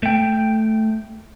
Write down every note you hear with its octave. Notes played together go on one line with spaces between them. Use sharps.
A3 G5